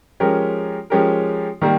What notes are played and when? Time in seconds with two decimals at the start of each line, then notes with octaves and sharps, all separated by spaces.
0.20 F3 G#3 C#4 G4 A#4
0.90 F3 G#3 C#4 G4 A#4
1.62 D#3 G3 A#3